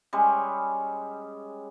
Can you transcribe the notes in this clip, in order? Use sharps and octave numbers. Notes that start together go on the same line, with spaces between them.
G3 G#3 C#4